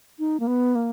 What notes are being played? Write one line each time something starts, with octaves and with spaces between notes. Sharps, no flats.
D#4
A#3
B3
A#3